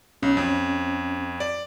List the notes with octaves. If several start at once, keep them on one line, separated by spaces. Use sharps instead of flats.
B1 C#4
F2
D5